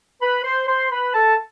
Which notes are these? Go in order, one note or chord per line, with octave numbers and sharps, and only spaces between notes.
B4 B5
C5 C6
C5 C6
B4 B5
A4 A5